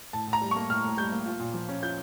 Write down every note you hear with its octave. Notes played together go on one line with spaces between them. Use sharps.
A2 A5
A2
A#5
G3
A#3 C#6
A2 F6
A2
G3 G6
A#3
F4
A#2
F3
C#4
F4 G6